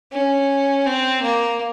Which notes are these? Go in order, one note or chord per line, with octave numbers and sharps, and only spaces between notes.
C#4
C4
A#3